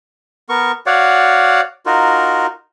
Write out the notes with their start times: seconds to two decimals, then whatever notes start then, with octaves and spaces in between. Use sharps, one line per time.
0.49 B3 A#4 C#6
0.86 F#4 C#5 D5 F5 F#5
1.86 D#4 F4 F#4 A#4